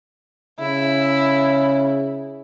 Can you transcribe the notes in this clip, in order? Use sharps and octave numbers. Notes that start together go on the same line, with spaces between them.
C#3 E4